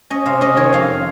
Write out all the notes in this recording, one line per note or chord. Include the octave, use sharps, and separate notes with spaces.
C#4 D#5
C3 F5
C#4 D#5
D#3 C#5
F2 F5